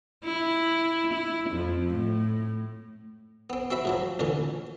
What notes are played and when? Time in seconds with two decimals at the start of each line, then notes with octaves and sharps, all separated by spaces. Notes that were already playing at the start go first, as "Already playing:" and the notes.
0.25 E4
1.13 E4
1.50 F2
1.93 A2
3.50 B3 C4
3.71 C4 F#4 E5 B5
3.85 G#2 F3 F#3
4.19 A1 F2 A#2 D3 E3